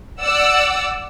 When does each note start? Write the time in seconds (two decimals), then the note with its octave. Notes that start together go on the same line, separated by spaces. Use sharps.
0.20 D5 F#5 E6